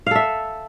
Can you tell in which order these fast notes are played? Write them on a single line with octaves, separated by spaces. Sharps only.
F5 A4 E5